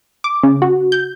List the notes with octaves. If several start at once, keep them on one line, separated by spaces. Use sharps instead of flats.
D6
C#3
F#4
G6